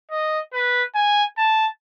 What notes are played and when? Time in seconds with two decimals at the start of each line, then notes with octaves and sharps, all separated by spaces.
0.11 D#5
0.53 B4
0.95 G#5
1.38 A5